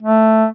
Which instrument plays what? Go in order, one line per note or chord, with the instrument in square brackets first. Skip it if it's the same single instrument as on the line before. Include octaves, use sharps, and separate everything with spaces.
[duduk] A3